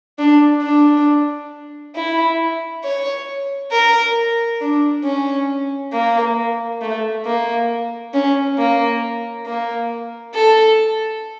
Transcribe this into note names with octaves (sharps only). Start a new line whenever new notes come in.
D4
D4
E4
C#5
A#4
D4
C#4
A#3
A3
A#3
C#4
A#3
A#3
A4